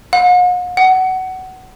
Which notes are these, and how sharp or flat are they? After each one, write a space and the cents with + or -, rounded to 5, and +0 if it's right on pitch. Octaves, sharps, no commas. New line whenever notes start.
F#5 -45
F#5 +20